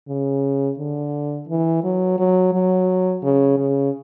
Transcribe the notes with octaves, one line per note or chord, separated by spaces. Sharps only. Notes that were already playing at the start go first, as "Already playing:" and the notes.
C#3
D3
E3
F#3
F#3
F#3
C#3
C#3